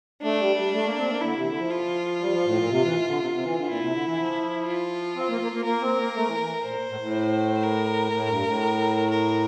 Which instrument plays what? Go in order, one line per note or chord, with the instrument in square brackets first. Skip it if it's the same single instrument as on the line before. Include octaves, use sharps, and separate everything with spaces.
[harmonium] A3 [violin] D4
[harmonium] G3
G3
A3
A#3
C4
A#3
[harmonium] D3 [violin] E4
[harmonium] C3
E3
D3
F3
[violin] F4
[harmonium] G3
F3
A2
A#2
C3
E3
D3
C3
C3
E3
D3
[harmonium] A#2 [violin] E4
[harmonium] C3
D3
E3
F3
[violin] F4
[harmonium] C4
A#3
A#3
A#3
[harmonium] A#3 [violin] A#4
[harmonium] C4
A#3
A3
E3
E3
[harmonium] A#2 [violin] C5
[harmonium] A2
A2
[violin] A#4
[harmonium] A2
G2
A2
[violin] A#4